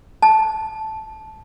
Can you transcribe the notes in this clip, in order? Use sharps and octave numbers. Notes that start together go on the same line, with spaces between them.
A5